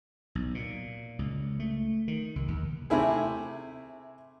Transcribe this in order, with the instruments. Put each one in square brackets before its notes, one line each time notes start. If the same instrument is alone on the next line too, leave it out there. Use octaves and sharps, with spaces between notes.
[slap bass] B1
A#2
C#2
A3
D#3
C2
D#2
[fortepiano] C3 A3 E4 G#4